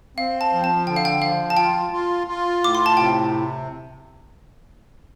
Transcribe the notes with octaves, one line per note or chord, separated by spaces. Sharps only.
C4 F5
A5
F3
A5
D3 G5
F5
G5
F3 F5
A5
F4 G5
F4
F4
A2 D6
C6
A5
C3 G5